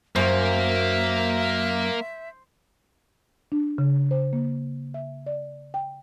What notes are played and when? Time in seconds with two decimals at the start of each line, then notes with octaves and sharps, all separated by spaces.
0.16 F#2 A#3 C5 E5 C#6
3.52 D4
3.78 C#3
4.11 C5
4.33 A#3
4.94 E5
5.26 D5
5.74 G5